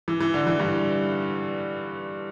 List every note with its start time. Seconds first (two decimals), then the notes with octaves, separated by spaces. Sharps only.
0.08 E3
0.20 E3
0.34 D3
0.47 E3
0.60 G2